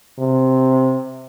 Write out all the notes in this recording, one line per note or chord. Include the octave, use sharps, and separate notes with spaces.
C3